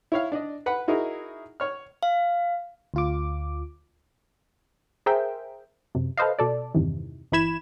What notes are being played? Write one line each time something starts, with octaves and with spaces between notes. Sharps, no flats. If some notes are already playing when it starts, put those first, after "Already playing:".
E4 C#5 F5
D4 D5 D#5
B4 F#5 B5
D#4 E4 F#4 G#4 A#4
C#5 F6
F5
D2 F4 D6
G#4 A#4 C5 E5 G5
F#2 C3
A4 B4 C5 D#5 F5
B2 A4 D5
E2 G2 C3 D#3 E3
G1 E3 E4 B5 G#6 E7